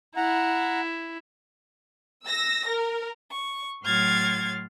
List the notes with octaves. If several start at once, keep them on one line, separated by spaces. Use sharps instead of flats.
E4 F#5 A#5
E6 A#6
A#4
C#6
A2 F#3 C6 F6 G#6 A6